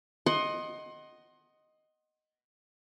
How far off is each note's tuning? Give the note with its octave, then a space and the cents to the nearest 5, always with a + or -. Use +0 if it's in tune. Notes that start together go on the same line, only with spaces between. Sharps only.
D#5 +0 F#5 +20 C6 +25